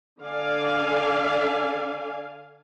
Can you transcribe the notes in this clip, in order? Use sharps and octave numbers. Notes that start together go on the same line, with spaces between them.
D3 A4 D5 F5 G#5